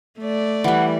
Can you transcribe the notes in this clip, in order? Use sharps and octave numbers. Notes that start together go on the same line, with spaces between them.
A3 D5
E3 G3 F#5